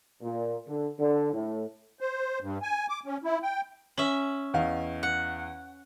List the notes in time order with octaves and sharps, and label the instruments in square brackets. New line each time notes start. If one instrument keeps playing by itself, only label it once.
[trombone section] A#2
D3
D3
A2
[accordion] C5
G2
G#5
D6
C#4
E4
G5
[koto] C#4 E5 [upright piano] F#7
[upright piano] E2 D#5 F5
[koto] F#5